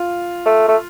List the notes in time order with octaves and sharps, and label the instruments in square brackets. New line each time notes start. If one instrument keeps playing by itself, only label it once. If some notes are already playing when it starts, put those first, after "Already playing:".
Already playing: [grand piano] F4
[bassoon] A3
A3